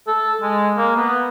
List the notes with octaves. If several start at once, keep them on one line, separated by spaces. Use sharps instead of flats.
A4
G#3
A#3
B3